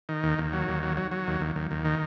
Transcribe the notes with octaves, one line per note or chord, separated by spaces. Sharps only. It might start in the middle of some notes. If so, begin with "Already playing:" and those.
D#3
D#2
D#2
F#3
D#2
F#3
F#3
F#3
D#2
D#2
D#2
D#2
D#3